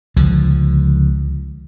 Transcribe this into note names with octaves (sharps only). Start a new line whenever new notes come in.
C#2 D3 F3